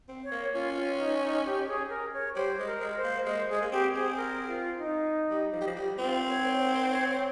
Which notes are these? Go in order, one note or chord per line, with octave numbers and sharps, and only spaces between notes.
C4
C#5
A#3
C#4 F4
F4
D#4
D#4
G4
G#4
A#4
C#5
G3 C5
G#3
A#4
G#3
C5
A#3
G#3 C5
G#3 G#4
A#3
C4 G4
C4 G#4
A#4
F4
D#4
G3
F3
G3
F3
G3
C4 F4
C#5
C5
C#5